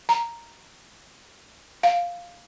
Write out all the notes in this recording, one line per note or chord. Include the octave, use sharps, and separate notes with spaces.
A#5
F5